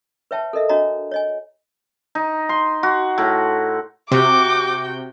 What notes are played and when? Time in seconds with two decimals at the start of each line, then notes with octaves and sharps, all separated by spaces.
0.31 B4 C#5 E5 G5 A5
0.53 A4 A#4 D#5 E5
0.69 D4 F#4 C#5 D#5 A#5
1.12 C#5 D#5 G#5
2.15 D#4
2.49 C6
2.83 F#4
3.18 A2
4.12 C3 F#4 G5 D6